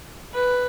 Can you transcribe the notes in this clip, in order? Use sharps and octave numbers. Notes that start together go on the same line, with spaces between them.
B4